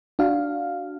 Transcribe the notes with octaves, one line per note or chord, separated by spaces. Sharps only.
D4 F#4 F5